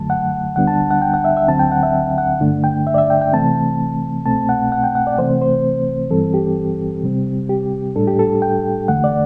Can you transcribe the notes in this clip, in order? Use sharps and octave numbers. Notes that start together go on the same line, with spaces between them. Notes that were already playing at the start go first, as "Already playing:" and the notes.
Already playing: F#2 D3 F#3 A3 A5
F#5
D2 D3 G3 B3 D4 F#5
A5
F#5
G5
F#5
E5
E5
D2 D3 F#3 C4 A5
G5
F#5
E5
F#5
G2 D3 A3 D4
G5
E5
D5
E5
G5
G5
C3 E3 A3 C4 A5
C2 B2 A3 C4 A5
F#5
F#5
G5
F#5
D5
C3 E3 A3 C4 C5
C5
G2 E3 G3 C4 A4
G4
C3 G3 C4
G4
A2 G3 D4 A4
G4
A4
G5
E2 D3 A3 F#5
D5